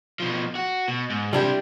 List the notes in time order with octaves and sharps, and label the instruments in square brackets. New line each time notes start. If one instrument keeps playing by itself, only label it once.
[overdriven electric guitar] B2 F3
F#4
B2
G#2
[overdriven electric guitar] C3 E4 [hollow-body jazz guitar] G3 D4 G4